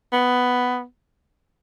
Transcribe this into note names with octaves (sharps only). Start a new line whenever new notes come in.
B3